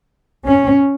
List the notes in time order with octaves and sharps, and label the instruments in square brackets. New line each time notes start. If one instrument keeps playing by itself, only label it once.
[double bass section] C#4